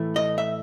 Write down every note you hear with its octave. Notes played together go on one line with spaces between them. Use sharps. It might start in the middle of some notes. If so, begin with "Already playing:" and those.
Already playing: A2 E3 A3 E4
D#5
E5